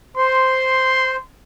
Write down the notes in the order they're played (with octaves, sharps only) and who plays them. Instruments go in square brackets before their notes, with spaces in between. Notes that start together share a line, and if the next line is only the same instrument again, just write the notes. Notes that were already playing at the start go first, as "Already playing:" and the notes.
[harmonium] C5 [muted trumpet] C6